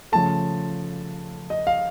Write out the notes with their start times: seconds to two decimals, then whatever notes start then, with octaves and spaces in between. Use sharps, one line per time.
0.12 C#3 F3 A3 A5
1.50 D#5
1.67 F5